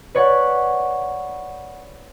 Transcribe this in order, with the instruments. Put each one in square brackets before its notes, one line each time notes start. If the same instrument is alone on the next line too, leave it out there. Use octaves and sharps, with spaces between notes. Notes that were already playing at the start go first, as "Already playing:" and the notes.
[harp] B4 C#5 D5 F#5